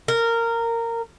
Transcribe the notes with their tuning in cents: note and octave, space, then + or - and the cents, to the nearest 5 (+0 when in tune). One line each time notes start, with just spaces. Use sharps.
A#4 -15